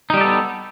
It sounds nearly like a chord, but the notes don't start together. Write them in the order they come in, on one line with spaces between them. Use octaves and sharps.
D#4 G3 G4 A4 B3